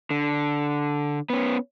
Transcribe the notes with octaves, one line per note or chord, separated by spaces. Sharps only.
D3
B3 C#4